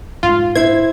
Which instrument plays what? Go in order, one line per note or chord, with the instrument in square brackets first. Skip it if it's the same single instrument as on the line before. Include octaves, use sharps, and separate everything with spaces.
[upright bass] G#2 [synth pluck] F4
[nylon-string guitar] E4 C5 [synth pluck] G#6